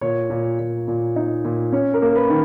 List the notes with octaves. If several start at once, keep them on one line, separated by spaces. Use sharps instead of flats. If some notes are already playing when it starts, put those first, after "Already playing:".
A#2 C#5
A#2
A#2
A#2
D#4
A#2
C#4 C#5
A#4
A#3
B4
D#3